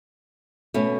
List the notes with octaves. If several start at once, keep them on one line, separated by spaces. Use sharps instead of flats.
B2 A3 C#4